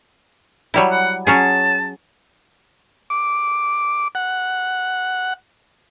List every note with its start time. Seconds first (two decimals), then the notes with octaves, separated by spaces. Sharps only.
0.74 F#3 G3 E4
0.91 F#5
1.27 F#3 C#4 G#4 A5
3.10 D6
4.15 F#5